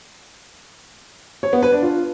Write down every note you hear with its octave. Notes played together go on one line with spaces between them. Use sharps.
C#5
B3
B4
D4
F4